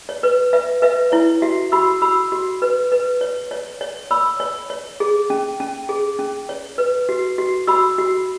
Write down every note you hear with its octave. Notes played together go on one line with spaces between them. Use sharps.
C#5
B4
B4 E5
B4 E5
E4 C#5
F#4 E5
F#4 B5 E6
F#4 B5 E6
F#4
B4
B4
C#5
C#5
C#5
C#5 B5 E6
C#5
C#5
G#4
C#4
C#4
G#4
C#4
C#5
B4
F#4
F#4
F#4 B5 E6
F#4